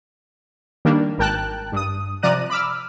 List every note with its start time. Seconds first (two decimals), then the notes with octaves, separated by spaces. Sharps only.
0.85 D#3 G3 A#3 D4
1.18 G#1 A#4 G5 A5 F#6
1.72 G2 D#6
2.23 C3 F3 D5 A#5 F#6 D#7
2.50 B5 D6 E6 F6